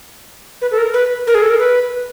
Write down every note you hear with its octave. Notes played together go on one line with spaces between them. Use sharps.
B4
A4
A#4
B4
A#4
G#4
A4
A#4
B4